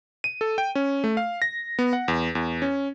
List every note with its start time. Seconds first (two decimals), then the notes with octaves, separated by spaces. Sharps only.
0.24 D#7
0.41 A4
0.58 G5
0.75 C#4
1.04 A3
1.17 F5
1.42 A#6
1.79 B3
1.93 F#5
2.08 E2
2.35 E2
2.62 C#4